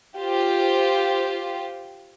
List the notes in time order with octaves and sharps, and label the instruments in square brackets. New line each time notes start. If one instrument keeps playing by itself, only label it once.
[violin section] F4 G4 C5